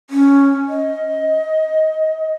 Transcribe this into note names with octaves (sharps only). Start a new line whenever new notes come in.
C#4
D#5